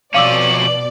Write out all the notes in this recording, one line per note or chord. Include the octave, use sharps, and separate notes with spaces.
F2 B2 C#4 D5 F5 D6 E6 F#7